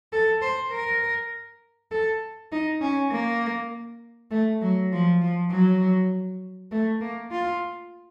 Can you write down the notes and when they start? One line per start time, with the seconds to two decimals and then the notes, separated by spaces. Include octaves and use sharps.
0.12 A4
0.41 C5
0.72 A#4
1.91 A4
2.52 D#4
2.81 C#4
3.11 A#3
4.31 A3
4.61 F#3
4.92 F3
5.21 F3
5.51 F#3
6.71 A3
7.01 A#3
7.31 F4